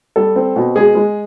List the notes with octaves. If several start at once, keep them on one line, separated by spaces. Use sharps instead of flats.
G3 A4
C4
B2
G#3 G#4
G#3